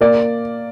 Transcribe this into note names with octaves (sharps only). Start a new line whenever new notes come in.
A#3 D5